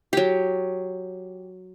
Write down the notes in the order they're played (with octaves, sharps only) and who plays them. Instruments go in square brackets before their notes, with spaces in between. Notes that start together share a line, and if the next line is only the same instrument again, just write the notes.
[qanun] F#3 G4